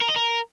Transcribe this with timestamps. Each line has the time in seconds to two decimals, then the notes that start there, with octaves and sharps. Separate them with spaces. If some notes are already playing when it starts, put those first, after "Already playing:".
0.01 A#4
0.09 D#5
0.16 A#4